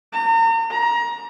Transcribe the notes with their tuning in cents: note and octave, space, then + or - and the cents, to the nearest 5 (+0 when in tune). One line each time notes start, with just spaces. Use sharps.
A#5 -40
A#5 +25